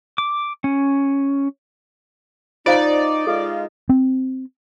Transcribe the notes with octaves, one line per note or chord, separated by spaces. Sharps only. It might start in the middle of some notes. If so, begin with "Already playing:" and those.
D6
C#4
D#4 F4 C5 D5 F5
G#3 D#4 F4 A4
C4